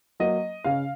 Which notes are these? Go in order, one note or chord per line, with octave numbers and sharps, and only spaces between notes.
F#3 A#3 D#5
C#3 F5